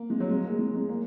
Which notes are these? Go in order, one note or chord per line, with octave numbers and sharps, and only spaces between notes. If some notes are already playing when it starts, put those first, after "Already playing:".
Already playing: A#3
G#3
F#3
G#3
A#3
G#3
G#3
A#3